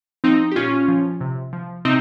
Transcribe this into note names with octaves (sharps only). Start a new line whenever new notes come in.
F3 C4 D#4
G4
A#2 C#4 F4
F3
C3
F3
C3 C4 D#4